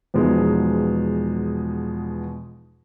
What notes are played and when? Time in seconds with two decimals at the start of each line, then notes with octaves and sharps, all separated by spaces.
0.14 E2 B2 F3 G#3 D#4